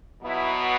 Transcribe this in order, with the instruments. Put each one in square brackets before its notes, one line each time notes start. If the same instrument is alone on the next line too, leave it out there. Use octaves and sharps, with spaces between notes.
[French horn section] B2 F#3 B3 E4